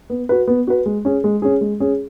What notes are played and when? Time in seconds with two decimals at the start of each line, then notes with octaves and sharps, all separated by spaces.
0.10 B3
0.29 F#4 B4
0.47 B3
0.67 F#4 B4
0.86 G#3
1.05 C#4 G#4
1.24 G#3
1.42 C#4 G#4
1.61 G#3
1.80 C#4 G#4